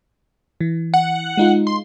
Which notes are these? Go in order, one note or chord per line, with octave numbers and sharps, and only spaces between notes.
E3
F#5
G#3 D#4 F4
C6